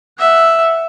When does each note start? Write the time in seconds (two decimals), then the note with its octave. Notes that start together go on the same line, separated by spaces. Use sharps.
0.19 E5 F#5